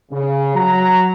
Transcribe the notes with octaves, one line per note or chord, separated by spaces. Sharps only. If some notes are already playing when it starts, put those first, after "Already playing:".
C#3
F#3 A#5